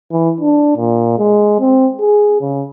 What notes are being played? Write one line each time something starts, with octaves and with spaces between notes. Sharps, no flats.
E3
D4
A#2
G#3
C4
G#4
C#3